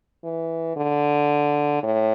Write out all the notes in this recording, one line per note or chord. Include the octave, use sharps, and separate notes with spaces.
E3
D3
A2